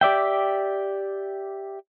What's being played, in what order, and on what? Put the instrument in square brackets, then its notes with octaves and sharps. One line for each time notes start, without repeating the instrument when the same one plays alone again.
[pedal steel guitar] G4 D5 E5 G5